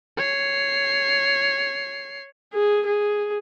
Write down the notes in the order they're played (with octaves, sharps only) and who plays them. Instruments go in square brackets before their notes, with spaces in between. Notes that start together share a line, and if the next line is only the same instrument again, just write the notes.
[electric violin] C#5 C7
[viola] G#4
G#4